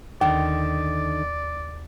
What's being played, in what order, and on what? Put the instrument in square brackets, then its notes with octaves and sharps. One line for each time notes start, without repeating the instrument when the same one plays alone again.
[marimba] D#2 [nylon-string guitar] D3 D#3 [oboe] D5